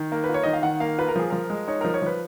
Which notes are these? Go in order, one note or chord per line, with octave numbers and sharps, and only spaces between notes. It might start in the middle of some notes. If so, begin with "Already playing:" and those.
Already playing: D#3
A#3
B4
F4
C#5
D#3 D#5
F5
D#3 F#5
A#3 F5
F4 B4
A#4
F3 G#4
F3 A#4
G#3
D#4 C#5
F3 A#4
C#5
F3 B4